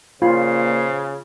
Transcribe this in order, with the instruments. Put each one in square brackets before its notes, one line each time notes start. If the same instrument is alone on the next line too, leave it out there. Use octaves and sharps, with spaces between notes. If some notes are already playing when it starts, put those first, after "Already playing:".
[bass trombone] A#2 [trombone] C#3 [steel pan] F4 [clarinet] C5